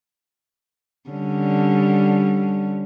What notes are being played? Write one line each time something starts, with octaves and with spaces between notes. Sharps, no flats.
D3 G3 C#4